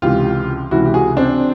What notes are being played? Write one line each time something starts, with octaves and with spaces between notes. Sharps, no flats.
C#2 C3 E3 F4 G4
C#2 C3 E3 E4 F#4
G4
F#4 G#4
C4 D4